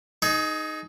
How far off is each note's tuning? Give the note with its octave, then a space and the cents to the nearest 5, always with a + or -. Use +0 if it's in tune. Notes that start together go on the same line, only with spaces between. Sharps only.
D#4 -5 G#4 +25